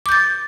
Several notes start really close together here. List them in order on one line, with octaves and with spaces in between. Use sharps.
D6 G6 A6